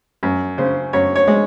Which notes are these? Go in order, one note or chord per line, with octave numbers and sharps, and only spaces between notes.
F#2
C#3 C5
F#2 C#5
C#5
G#3